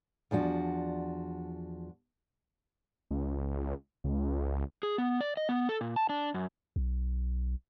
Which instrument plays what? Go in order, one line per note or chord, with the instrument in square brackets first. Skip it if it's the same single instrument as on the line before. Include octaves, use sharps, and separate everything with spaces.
[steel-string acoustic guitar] E2 F3 D4 F#4
[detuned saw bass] C#2
C#2
[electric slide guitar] G#4
B3
D5
D#5
B3
A4
A#2
A5
D4
F#2
[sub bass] B1